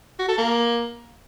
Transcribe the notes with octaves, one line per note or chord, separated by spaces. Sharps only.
F#4
A4
A#3